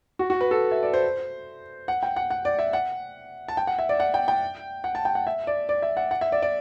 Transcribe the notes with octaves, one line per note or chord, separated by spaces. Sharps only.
F#4
F#4
B4
A4
E5
D5
C5
F#5
G5
F#5
F#5
D5
E5
F#5
A5
G5
F#5
E5
D5
F#5
G5
G5
F#5
A5
G5
F#5
E5
D5
D5
E5
F#5
F#5
E5
D5
D5